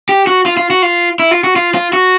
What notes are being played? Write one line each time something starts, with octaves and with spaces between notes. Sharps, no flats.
G4
F#4
F4
F4
F#4
F4
E4
F4
F#4
F4
F4
F#4